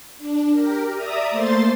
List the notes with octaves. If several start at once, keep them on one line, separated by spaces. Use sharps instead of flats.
D4
G4 A#4
D5 E5 A#5 D#6
A3 A#3 C5 C6 A6